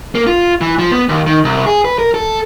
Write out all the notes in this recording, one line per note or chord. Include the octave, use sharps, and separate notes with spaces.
A#3
F4
E3
F3
B3
D#2
D#3
C2
G#4
B4
A#4
A4